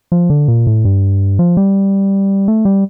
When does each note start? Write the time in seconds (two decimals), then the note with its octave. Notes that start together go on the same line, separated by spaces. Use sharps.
0.12 F3
0.30 D3
0.48 A#2
0.67 A2
0.85 G2
1.39 F3
1.57 G3
2.48 A3
2.65 G3